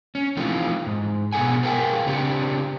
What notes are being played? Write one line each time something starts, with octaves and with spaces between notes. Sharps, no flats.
C#4
E3 F3 A3 C4 D#4 F4
G#2
B2 B3 G#4 A4 F#5 G#5
G#4 A#4 B4 F5 G5 G#5
C#3 C4 D4 G4